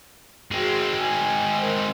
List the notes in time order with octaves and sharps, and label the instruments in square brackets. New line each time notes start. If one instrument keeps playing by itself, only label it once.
[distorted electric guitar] G#3 C4 [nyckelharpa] F#4 G#4
[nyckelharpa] G#5
A#4 C5